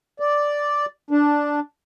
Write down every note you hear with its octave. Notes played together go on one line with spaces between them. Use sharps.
D5
D4